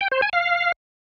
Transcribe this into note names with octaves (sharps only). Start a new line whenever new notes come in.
G5
C5
G#5
F5